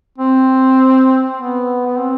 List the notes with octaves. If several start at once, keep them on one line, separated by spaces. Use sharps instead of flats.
C4
B3
B3
C4